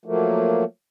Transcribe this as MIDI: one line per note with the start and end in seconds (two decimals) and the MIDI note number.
0.05 0.64 53
0.05 0.64 54
0.05 0.64 57
0.05 0.64 58